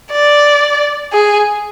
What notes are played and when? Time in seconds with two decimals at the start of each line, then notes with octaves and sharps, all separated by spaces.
0.12 D5
1.13 G#4